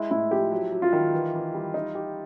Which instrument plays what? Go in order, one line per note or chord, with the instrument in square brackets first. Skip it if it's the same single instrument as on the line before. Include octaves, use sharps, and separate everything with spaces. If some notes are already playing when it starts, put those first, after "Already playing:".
Already playing: [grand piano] G#3 [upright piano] E4
[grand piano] A2 [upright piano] E4
[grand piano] F3 [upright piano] G4
[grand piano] F#3
F#3
[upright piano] F4
[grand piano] D#3
E3
E3
G3
D#4
G4